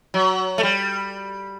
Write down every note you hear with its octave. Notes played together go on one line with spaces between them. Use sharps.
F#3
A3
G3